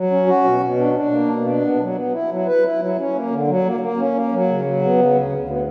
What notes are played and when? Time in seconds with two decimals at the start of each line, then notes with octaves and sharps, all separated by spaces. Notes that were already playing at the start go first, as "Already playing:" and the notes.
Already playing: F#3
0.10 C#4
0.27 F#4
0.44 B2
0.61 B2
0.78 D4
0.94 D4
1.11 A#3
1.28 B2
1.45 D4
1.61 B3
1.79 F#3
1.95 B3
2.12 E4
2.29 F#3
2.46 B4
2.63 E4
2.79 F#3
2.97 C#4
3.14 A#3
3.30 D3
3.47 F#3
3.64 A#3
3.80 A#3
3.97 C#4
4.14 A#3
4.31 F#3
4.47 C#3
4.65 F#3
4.82 B3
4.98 C#3
5.15 D2
5.32 D2
5.49 B3